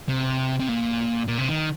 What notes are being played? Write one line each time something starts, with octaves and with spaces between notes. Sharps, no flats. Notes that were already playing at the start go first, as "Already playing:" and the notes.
C3
C3
A#2
A#2
C3
D#3